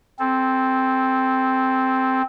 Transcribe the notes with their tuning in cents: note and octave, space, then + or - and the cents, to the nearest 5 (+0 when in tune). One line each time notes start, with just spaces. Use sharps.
C4 +0 A4 -25